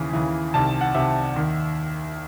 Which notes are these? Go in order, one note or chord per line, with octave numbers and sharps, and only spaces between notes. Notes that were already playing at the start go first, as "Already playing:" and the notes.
Already playing: D#2 C#3 E3
D#2 C#3 E3
C2 C3 D#3 A5
F#5
C2 C3 D#3 E5
D#2 D#3